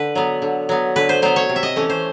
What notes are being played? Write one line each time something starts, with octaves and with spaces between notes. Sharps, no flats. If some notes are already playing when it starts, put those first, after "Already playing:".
Already playing: D3 B4
F#3 B3
D3
F#3 B3
D3 B4
C5
F#3 B3 C5
C#5
C3
E5
D#5
E3 A3 C#4
C5